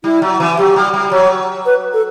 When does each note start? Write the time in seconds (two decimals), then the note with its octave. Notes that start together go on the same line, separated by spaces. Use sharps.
0.04 G3 E4
0.22 F#3
0.40 E3
0.58 F#3 G4
0.76 G3
0.94 G3
1.12 F#3 C#5
1.66 B4
1.94 A4